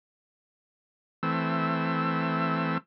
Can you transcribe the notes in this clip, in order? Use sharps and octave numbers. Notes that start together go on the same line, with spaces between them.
E3 A3 C4 E6